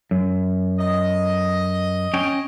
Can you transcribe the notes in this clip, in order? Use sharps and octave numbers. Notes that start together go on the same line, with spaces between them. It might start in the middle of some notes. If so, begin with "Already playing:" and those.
F#2
D#5
C#4 G5